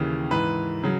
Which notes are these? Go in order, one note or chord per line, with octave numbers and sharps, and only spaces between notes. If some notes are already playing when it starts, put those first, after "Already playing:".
Already playing: D#2 C#3 E3
G#2 E3 B4
C#3 F#3